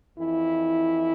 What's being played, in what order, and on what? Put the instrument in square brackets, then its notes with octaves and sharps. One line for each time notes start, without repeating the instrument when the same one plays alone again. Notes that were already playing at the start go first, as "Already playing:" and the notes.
[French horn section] F2 E3 E4